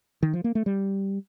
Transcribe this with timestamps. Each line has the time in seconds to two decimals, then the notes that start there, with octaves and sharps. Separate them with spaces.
0.23 D#3
0.33 F3
0.44 A#3
0.55 A3
0.66 G3